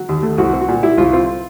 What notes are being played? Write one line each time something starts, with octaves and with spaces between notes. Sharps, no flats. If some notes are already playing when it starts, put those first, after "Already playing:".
Already playing: F#3
D#2
A3
C2 F#4
C4
F#4
A#2
G3 E4
C2 F4
C4 F4